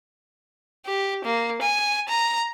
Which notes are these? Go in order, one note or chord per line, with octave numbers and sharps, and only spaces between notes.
G4
A#3
G#5
A#5